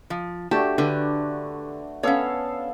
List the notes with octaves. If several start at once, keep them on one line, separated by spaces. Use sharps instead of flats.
F3
A3 D4 F#4 G4 A5
D3 B4
B3 C#4 A4 C#5 F5